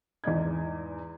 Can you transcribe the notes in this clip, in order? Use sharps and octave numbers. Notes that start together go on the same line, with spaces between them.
E2 G#2 D5 D#5 G#6